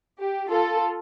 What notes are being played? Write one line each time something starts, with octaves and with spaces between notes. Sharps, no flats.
G4
F4 A4